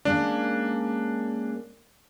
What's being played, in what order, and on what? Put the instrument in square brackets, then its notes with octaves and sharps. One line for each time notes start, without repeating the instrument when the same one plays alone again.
[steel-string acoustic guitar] G#3 A#3 C#4 [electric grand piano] D4